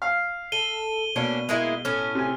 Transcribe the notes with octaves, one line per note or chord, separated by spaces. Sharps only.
F5
A4 D#7 G7
B2 A#3 C#4 D4
G#3 A#3 E4
A2 C#4 F6
C3 G#5